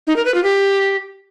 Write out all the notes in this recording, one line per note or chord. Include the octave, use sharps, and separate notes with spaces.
D#4
A#4
B4
F4
G4